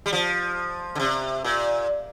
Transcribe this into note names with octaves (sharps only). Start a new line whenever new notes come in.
G3
F3
D3
C3
A#2